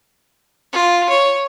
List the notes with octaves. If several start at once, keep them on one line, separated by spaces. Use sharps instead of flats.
F4
C#5